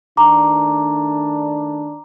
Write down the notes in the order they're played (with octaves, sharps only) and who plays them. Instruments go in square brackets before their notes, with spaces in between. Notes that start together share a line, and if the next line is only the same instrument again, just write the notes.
[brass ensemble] D#3 A3 D4 [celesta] A#5 D6